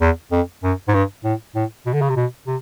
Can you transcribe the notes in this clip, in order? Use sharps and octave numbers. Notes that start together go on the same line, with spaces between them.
E2
F2
F#2
G#2
G2
A2
A2
B2
D3
C#3
C3
B2
C3